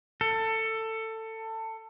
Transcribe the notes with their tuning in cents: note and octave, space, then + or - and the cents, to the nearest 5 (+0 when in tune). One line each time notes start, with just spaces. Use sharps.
A4 +20